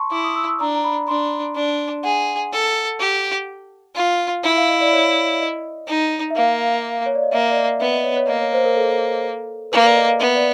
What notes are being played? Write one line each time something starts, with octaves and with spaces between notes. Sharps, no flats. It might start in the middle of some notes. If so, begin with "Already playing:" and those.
Already playing: A5 C6 C#6
E4 D6
D#6
E6
E6
D4 A#5
A#5
B5
D4 C6
D4
G#4 F#5
A4
G4
F4
E4 E5
F5
D#5
D5
C#5
D#5
D#4
E5
A#3 F5
C#5
D5
D#5
A#3 E5
D5
D#5
B3 E5
D#5
C#5
C#5
A#3 D#5
C#5
C5
A#4
A4
A#3 B4
D5
D#5
F5
B3 E5
D5